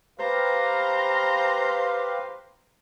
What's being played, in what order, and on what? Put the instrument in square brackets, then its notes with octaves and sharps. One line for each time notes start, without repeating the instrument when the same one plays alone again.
[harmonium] G4 B4 F5 [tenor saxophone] C5 [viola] A#5